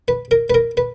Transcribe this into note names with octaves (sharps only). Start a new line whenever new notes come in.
B4
A#4
B4
A#4
B4